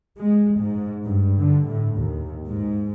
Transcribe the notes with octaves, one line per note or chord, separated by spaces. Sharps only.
G#3
G#2
G2
D3
A2
D#2
G#2